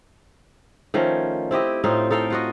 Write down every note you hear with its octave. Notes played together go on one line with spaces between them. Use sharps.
D#3 F3 A3 C#4
C4 E4 G4 D#5
A2 C4 D#4 F4
D#4 A4 F5 G5
F4 F#4 D#5